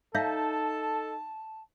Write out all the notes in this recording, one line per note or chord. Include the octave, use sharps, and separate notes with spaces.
D#4 A4 C#5 E5 F5 A5